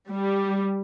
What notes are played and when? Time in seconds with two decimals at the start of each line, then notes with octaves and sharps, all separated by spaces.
0.09 G3